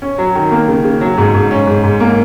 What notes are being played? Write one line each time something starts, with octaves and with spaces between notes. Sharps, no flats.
C#4
F#3
D#3
A#3
C#3
C#3
F#3
G#2
G#2
C#4
G#2
G#2
A#3